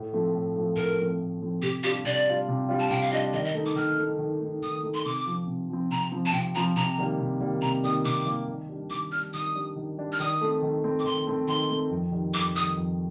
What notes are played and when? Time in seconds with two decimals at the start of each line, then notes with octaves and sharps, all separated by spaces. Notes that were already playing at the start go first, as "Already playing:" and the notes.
Already playing: A2
0.13 F3 A3 C4
0.34 A2
0.56 F3 A3 C4
0.76 A2 A#4
0.98 F3 A3 C4
1.20 A2
1.41 F3 A3 C4
1.62 C3 G4
1.83 F4 G4
1.86 G3 D4
2.05 C3 D5
2.27 G3 D4 F4
2.48 C3
2.69 G3 D4 F4
2.79 A5
2.90 C3 G5
3.02 F5
3.12 G3 D4 F4 D#5
3.33 D#3 D#5
3.44 D#5
3.54 A3 D#4
3.66 D6
3.76 D#3 F6
3.98 A3 D#4
4.19 D#3
4.41 A3 D#4
4.62 D#3 D#6
4.83 A3 D#4
4.94 C6
5.05 C3 D6
5.26 F3 C4
5.47 C3
5.69 F3 C4
5.90 C3 A#5
6.12 F3 C4
6.26 A5
6.33 C3 G5
6.55 F3 C4 A#5
6.76 C3 A#5
6.98 D#3 G3 A#3
7.19 C3
7.41 D#3 G3 A#3
7.62 C3 A#5
7.83 D#3 G3 A#3 D#6
8.05 C3 D6
8.26 D#3 G3 A#3
8.48 D#3
8.69 G3 D4
8.90 D#3 D6
9.12 G3 D4 F6
9.33 D#3 D#6
9.55 G3 D4
9.76 D#3
9.98 G3 D4
10.12 F6
10.20 D#3 D#6
10.41 A3 C4
10.62 D#3
10.84 A3 C4
10.99 D6
11.05 D#3 C6
11.27 A3 C4
11.48 D#3 C6
11.70 A3 C4
11.90 F2
12.12 D#3 G3
12.34 F2 D6
12.55 D#3 D#6
12.58 G3
12.77 F2